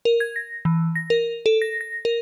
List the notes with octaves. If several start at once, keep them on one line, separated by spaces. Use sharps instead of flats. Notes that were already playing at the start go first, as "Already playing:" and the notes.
A#4
G#6
A#6
E3
A#6
A#4
A4
A#6
A#6
A#4